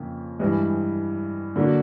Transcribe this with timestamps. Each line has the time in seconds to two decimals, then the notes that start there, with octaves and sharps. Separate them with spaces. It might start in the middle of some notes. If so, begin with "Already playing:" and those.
Already playing: F2 C#3 A#3
0.39 G2 E3 G#3
1.56 D3 F#3 A#3